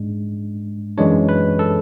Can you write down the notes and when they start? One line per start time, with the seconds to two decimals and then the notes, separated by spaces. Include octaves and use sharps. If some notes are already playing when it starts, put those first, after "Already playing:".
Already playing: G#2 G#3 D4
0.98 F#2 E3 G#3 D4 C#5
1.29 B4
1.59 A4